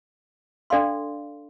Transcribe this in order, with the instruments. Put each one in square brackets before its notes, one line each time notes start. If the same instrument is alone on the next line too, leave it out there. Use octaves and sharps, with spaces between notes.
[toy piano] D4 A4 D5 F5 C6